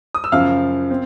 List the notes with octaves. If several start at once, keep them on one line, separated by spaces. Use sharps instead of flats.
D#6
E6
F#2 C#3 F3 F5 F6
C4